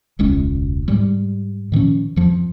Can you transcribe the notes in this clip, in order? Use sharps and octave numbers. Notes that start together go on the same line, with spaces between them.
E1 C#2 G#3 C#4
G#2 G3 G#3
A#2 D#3 F3 C#4
F2 F3